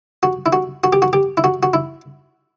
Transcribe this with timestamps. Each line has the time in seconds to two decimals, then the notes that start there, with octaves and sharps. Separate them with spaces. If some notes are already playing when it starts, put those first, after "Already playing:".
0.23 F#4
0.46 E4
0.53 F#4
0.84 F#4
0.93 G4
1.02 F#4
1.13 G4
1.37 E4
1.44 F#4
1.63 F#4
1.74 E4